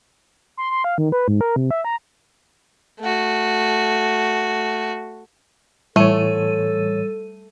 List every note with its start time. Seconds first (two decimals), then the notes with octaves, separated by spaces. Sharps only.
0.57 C6
0.71 C6
0.84 F5
0.98 D#3
1.12 B4
1.28 G#2
1.41 A#4
1.56 C3
1.71 E5
1.85 A#5
3.00 A3 F#4
5.96 A2 E3 G3 A3 A4 C#5 D#7